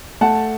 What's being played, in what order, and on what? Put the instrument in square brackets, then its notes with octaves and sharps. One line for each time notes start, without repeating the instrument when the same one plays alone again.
[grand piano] A3 F#5 A5